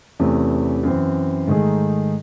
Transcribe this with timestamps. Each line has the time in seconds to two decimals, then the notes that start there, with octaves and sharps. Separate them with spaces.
0.19 E2 C3 E3 A3 C#4
0.83 F#2 E3 C4
1.47 G#2 D#3 A3 D#4 G#4